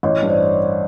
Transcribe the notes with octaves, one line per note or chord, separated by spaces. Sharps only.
A1 C#5 D#5
G2
C5 D5